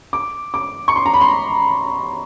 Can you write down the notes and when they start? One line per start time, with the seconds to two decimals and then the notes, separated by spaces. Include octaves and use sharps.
0.13 D6
0.54 D6
0.88 C#6
0.96 C6
1.06 A#5
1.14 B5
1.21 C6